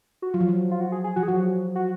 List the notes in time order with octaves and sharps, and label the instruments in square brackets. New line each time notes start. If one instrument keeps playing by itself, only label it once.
[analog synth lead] F#4
[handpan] F#3 [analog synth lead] F4
[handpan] F3
F#3
[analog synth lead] F4
F#4
G#4
G#4
[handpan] F3 [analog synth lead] F#4
[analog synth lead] G#4
[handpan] F#3 [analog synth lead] F#4
[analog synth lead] F#4